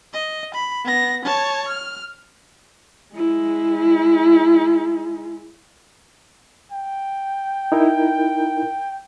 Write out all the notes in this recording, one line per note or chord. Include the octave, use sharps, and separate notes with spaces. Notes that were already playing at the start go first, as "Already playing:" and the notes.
D#5
B5
B3 A#6
C#5 A5
F6
G#3 E4
G5
D#4 E4 A#4